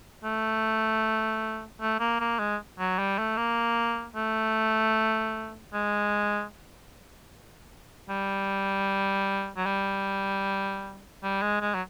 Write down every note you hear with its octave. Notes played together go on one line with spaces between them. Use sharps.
A3
A3
A#3
A#3
G#3
F#3
G3
A3
A#3
A3
G#3
G3
F#3
G3
G3
G#3
G#3
F#3